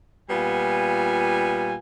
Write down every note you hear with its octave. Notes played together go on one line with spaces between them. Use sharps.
A#2 G3 B3 F4 G#5